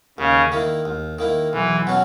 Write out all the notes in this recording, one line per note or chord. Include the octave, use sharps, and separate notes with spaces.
D#2 C#3
D#3 A#3 E4
D#2
D#3 A#3 E4
B1 E3
B2 F#3 C#4 F#4